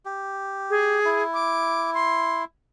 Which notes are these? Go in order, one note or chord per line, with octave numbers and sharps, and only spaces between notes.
G4
G#4
E4
D6
C6